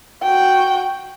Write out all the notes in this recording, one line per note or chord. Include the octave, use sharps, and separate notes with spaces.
F#4 G5